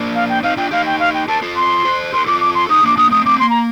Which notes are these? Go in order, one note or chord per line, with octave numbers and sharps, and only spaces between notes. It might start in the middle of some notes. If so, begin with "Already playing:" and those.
Already playing: A#3 D4
F5
G5
C4 D#4 F5
D4 F4 G5
D#4 G4 F5
G5
F5
G5
G4 A#4 A5
F4 A4
C6
A4 C5
G4 A#4 C6
F4 A4 D6
D6
C6
D#4 G4 D#6
A#3 D4 D6
A#3 D4 D#6
A3 C4 D#6
A3 C4 D6
A#3 C6
A#5